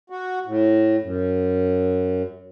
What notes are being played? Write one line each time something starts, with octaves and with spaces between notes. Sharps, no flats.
F#4
A2
F#2